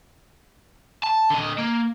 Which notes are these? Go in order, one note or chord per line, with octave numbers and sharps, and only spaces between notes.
A5
D3 D#5
A#3